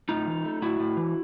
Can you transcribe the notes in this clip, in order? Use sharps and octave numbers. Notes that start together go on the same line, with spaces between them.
A2 D#4 F4
E3
A3
A2 E4 F#4
A2
E3